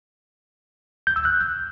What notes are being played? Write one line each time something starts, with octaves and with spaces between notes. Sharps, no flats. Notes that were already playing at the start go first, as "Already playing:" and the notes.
G6
E6
F#6